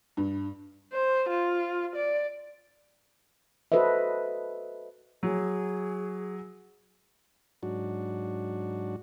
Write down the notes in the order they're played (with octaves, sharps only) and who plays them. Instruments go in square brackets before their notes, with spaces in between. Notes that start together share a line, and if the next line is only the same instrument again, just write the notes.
[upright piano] G2
[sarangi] C5
F4
D5
[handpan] F#4 A4 B4 C5 D#5 E5
[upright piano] F#3 [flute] G#4
[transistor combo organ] G#2 F#3 D4 F#4